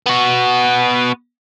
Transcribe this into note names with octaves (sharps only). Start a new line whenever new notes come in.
B3 F#4